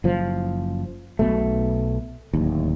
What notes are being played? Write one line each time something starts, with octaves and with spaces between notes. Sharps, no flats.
F#1 F3
B1 B2 A3
D1 D#2